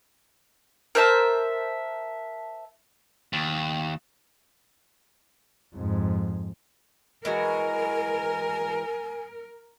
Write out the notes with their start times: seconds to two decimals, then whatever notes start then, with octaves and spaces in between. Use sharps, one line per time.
0.95 A#4 C5 E5 A5
3.33 D#2
5.75 F2 G#2
7.25 E3 G#3 F#4 A#4 G#5